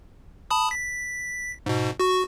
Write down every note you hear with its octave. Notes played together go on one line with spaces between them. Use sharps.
A5 B5 D#6
B6
G#2 B2
F#4 C#6